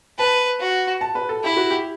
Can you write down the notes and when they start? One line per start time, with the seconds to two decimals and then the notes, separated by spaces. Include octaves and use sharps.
0.18 B4 A5
0.60 F#4
1.01 A5
1.15 B4
1.29 A4
1.43 E4 G4
1.57 F#4
1.70 G4